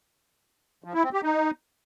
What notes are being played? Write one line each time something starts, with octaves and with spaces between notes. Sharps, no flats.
F3
E4
C4
G4
D#4